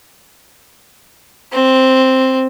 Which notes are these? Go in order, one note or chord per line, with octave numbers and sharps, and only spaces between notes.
C4